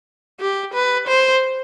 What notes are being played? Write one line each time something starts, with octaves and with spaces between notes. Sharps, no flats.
G4
B4
C5